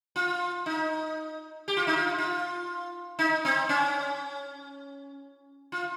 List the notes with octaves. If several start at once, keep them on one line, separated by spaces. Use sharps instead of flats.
F4
D#4
G4
F4
D#4
F4
F4
D#4
C4
C#4
F4